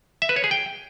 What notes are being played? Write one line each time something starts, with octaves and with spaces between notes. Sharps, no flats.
E5
B4
C#5
G#4
G5